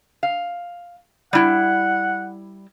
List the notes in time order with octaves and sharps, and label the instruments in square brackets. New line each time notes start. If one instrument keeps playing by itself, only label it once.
[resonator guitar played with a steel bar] F5
[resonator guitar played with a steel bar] G3 E4 [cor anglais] F#5